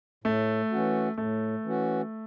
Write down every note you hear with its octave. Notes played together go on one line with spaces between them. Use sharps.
A2 A3
E3 C#4 F#4
A2 A3
E3 C#4 F#4